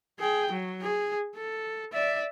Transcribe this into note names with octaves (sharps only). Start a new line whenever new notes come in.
G#4 G5
F#3
G#4
A4
D5 E5